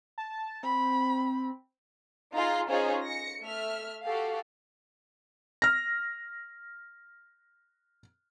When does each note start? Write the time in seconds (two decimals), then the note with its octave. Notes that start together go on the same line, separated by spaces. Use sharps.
0.18 A5
0.63 C4 B5
2.34 D#4 F4 G#4 A#5 C6
2.70 C#4 D#4 F4 G#4 C5 C#5
3.05 A#6 C#7
3.40 A3 E5 F6
4.04 F#4 G4 A4 F5
5.62 F6 A#6